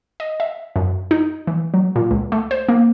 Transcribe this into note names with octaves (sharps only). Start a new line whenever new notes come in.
D#5
E5
F#2
D#4
E3
F#3
A#2
C#2
A3
C5
A#3